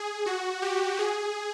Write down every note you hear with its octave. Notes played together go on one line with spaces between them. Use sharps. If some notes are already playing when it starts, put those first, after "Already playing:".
Already playing: G#4
F#4
G4
G#4